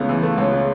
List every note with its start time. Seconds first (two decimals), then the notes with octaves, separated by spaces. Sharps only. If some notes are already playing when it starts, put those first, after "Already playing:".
Already playing: C#2 C#3 A3 B3
0.09 E3
0.23 A3
0.38 C#2 C#4
0.52 C#3